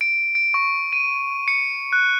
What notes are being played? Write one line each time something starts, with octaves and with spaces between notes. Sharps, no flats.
D7
D7
C#6
D#7
C#7
F#6